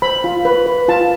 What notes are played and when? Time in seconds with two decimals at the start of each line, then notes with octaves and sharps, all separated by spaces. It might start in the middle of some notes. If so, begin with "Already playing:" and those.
0.02 C5 B5
0.24 F4
0.45 B4
0.66 B4
0.88 F4 A5